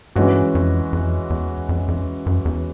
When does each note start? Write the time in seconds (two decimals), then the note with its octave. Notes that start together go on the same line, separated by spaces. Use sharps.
0.16 G2 E3 G#3 C#4 F#4
0.55 F2
0.93 F2
1.30 E2
1.69 F2
1.88 F2
2.26 F#2
2.45 E2